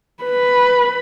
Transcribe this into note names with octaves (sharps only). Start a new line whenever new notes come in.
B4 B5